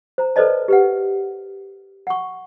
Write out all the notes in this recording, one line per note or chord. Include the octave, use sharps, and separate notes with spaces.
C5 A#5
A4 B4 C5 D5 D#5 A5
G4 B4 F#5
F#5 C#6